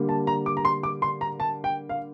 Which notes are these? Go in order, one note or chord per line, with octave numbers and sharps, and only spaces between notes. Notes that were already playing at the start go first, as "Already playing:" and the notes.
Already playing: D3 G3 A#3
A5
A#5
D6
A#5
C6
D6
C6
A#5
A5
G5
F5